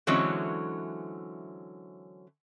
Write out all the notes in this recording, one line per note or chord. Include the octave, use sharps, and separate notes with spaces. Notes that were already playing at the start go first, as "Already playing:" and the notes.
D3 E3 F#3 G#3 C4 C#4